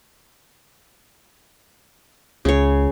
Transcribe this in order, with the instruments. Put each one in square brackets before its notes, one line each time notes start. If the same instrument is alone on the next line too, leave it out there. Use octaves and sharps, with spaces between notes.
[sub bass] C#2 [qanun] C#3 C#5